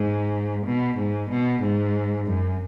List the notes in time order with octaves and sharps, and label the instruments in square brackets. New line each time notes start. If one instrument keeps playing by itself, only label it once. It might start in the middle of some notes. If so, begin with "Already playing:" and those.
Already playing: [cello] G#2
B2
G#2
B2
G#2
F#2